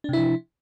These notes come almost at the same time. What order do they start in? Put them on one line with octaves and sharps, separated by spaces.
D4 C3 E4 F3